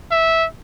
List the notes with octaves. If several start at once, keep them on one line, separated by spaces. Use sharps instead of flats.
E5